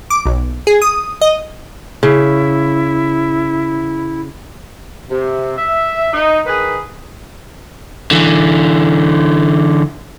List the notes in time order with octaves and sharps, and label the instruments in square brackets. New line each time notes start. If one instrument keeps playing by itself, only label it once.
[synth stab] D6
B1
G#4
D#6
D#5
[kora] C#3 [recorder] E4
[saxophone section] C3
E5
D#4
D#3 G#4 A#4 B4
[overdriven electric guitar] D3 E3